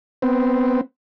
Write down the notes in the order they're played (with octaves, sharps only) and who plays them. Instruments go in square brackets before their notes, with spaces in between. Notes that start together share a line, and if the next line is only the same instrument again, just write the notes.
[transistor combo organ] B3 C4